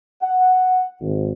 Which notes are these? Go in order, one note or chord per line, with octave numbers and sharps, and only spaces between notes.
F#5
G#1